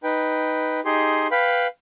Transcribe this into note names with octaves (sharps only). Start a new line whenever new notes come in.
D#4 B4 G5
D#4 G4 G#4 C6
B4 F5 G5 B5